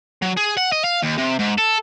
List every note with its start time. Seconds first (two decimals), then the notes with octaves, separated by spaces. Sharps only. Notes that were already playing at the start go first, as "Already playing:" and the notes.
0.22 F#3
0.37 G#4
0.57 F#5
0.72 D#5
0.84 F5
1.03 D#2
1.18 C3
1.39 G#2
1.58 A4